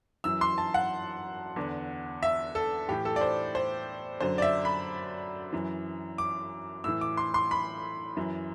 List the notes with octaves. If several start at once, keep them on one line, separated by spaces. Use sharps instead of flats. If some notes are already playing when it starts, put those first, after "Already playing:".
F#2 E3 E6
C6
A5
F#5
E2 D3
E5
A4
A2 E3 G4
A4
D5
C5
C5
F#2 D3 C5
D5
E5
B5
F#2 E3
D6
A2 E3 E6
D6
C6
C6
B5
F#2 E3